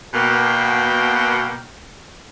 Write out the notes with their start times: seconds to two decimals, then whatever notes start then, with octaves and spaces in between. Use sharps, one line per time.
0.14 B2 A#3 G5